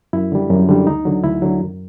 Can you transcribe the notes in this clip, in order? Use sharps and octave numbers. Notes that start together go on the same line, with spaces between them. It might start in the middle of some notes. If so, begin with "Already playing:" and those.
F#2 E4
D3 G3
F#2
D3 G3
D2 D#4
D3 F#3
D2 E4
D3 F#3
F#2